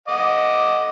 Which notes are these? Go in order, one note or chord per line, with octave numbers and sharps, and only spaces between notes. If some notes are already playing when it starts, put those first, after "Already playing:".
D#5 F#5 D6